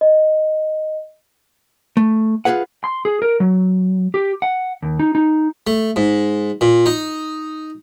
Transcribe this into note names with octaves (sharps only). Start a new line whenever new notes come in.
D#5
A3
F4 F#4 G#4 B4 F#5
C6
G#4
A#4
F#3
G4
F#5
D#2
D#4
D#4
A3
G#2
A#2
D#4